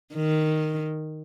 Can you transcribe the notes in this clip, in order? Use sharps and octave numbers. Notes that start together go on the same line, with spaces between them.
D#3